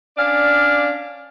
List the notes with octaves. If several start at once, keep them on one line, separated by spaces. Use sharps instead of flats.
C#4 D4 D5 F5